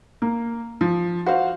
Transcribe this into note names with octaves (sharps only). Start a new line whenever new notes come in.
A#3
F3
F#4 C5 F5